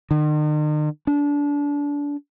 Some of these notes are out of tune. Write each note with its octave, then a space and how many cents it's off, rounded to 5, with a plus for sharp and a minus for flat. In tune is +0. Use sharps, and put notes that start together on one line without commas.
D#3 -45
D4 -25